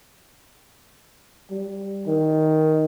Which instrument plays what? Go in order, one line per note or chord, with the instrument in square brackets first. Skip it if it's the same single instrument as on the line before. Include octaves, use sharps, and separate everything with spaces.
[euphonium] G3
D#3